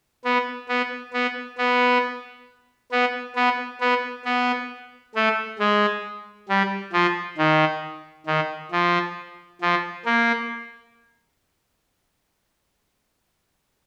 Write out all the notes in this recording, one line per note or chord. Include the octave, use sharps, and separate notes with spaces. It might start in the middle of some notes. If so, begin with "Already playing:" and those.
B3
B3
B3
B3
B3
B3
B3
B3
A3
G#3
G3
F3
D#3
D#3
F3
F3
A#3